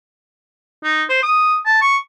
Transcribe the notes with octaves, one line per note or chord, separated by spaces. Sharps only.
D#4
C5
D#6
A5
C#6